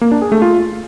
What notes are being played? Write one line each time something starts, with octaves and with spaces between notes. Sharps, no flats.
A#3
D4
G#4
A3
F4